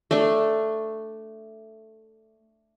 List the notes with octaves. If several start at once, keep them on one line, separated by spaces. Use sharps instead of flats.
A3 D4